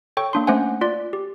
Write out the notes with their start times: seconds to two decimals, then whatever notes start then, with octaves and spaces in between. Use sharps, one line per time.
0.17 A4 C#5 G5 C#6
0.33 A#3 D4 C6
0.47 A3 C#4 C5 F#5 G#5
0.81 F4 D5
1.13 G4